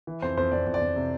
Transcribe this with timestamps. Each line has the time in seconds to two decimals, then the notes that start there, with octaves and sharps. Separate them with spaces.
0.07 E3
0.22 F2 C5
0.37 F2 C5
0.52 F2 D5
0.67 F2
0.74 D5
0.81 F2
0.96 C3